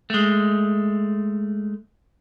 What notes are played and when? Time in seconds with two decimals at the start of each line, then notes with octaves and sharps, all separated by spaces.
0.10 G#3 A3